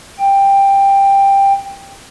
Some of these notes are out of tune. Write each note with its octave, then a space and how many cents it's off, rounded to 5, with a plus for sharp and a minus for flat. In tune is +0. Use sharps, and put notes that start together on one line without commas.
G5 +10